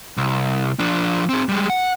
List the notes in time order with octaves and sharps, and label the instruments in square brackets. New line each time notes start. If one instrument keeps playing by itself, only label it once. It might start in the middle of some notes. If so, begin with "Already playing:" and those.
[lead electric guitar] C2
F3 D4
C4 G#4
G3 G#3
F#5